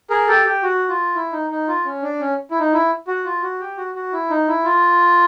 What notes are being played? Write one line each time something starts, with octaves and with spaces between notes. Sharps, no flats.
G#4 A#4
G4 A4
G4
F#4
F4
E4
D#4
D#4
F4
C#4
D4
C#4
E4
D#4
E4
F#4
F4
F#4
G4
F#4
F#4
E4
D#4
E4
F4